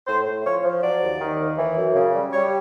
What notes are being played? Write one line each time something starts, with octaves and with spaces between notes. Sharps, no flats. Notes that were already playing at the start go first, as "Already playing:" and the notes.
A2 C5
A2
F3 C#5
F3
F#3 D5
D#2
D#3
D#2
E3
F#2
C#3
G3
G3 C#5